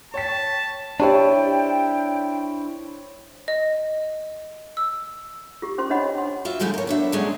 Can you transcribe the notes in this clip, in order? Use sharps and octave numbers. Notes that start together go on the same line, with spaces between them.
C#5 G5 A5 B6
D4 E4 G4 C5 C#5 G5 A5
D#5
E6
F4 G4
C#4 F4 C5 C6
D4 C#5 D#5 F#5 B5
C6
F4 F#4 E5
D3 F3 G#3 A3 E4 G4
A#4 C#5
B3 D4 E5
D3 F#3 G#3 A3 C#4 D4